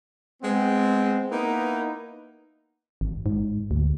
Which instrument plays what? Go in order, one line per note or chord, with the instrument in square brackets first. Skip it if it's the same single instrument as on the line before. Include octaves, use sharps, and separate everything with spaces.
[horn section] G#3 B3 C4
A#3 B3 D#4 E4 B4
[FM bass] G#1
G#2
D2